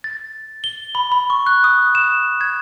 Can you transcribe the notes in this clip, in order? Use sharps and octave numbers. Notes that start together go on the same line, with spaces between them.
A6
G7
B5
B5
C#6
F#6
D#6
E7
G#6